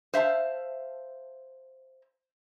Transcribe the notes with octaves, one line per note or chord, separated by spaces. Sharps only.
C5 E5 F5 A5